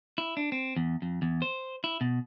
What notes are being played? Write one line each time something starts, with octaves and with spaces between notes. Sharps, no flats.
E4
D4
C4
E2
F2
E2
C5
E4
B2